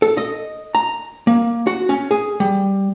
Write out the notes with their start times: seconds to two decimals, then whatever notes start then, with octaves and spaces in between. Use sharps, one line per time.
0.02 A4
0.17 D#5
0.75 A#5
1.27 A#3
1.67 F#4
1.89 C#4
2.11 G#4
2.40 G3